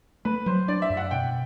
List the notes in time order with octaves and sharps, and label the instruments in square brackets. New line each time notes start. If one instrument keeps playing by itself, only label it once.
[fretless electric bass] A3 [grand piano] B4
[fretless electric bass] F#3 [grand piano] C5
[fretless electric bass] D4 [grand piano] D5
[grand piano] E5
[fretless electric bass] F#2
[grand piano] F#5
[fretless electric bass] B2 [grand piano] G5